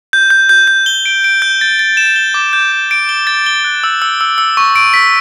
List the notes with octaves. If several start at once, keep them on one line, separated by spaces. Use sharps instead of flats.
G6
G6
G6
G6
G7
D7
D7
G6
A6
A6
E7
G7
D6
G6
G6
D7
G7
A6
G7
F#6
E6
E6
E6
E6
C#6
D7
B6